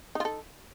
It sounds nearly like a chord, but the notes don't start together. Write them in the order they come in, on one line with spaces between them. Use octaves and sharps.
D#4 F4 A4